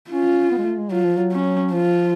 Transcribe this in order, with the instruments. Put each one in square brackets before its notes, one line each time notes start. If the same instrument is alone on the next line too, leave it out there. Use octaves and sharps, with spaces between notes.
[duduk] C#4 [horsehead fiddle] F4
[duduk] B3
G#3
A3
G#3
[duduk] F#3 [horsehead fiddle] F4
[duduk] F3
F#3
[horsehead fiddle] C#4
[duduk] F3 [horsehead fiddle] F4